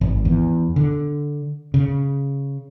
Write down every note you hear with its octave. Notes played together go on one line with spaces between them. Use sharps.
G#1
E2
D3
C#3